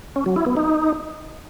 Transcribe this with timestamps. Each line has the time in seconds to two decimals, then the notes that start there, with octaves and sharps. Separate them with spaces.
0.16 C#4
0.26 F#3
0.36 E4
0.46 B3
0.57 D#4